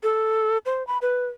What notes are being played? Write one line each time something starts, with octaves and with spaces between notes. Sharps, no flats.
A4
C5
B5
B4